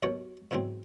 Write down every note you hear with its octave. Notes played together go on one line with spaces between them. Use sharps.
D#2 B2 F#3 F#4 C#5
E2 G#2 C#3 F#3 C4